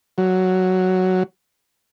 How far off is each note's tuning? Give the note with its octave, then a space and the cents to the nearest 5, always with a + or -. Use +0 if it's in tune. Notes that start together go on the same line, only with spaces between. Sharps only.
F#3 +5